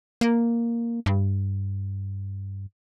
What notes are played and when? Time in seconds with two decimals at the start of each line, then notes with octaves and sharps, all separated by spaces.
0.21 A#3
1.06 G2